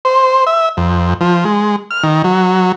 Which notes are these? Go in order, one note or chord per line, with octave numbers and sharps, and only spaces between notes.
C5
E5
F2
F3
G#3
F6
D#3
F#3